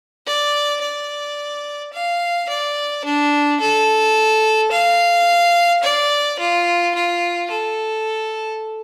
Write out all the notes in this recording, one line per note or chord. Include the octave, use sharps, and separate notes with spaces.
D5
D5
F5
D5
D4
A4
F5
D5
F4
F4
A4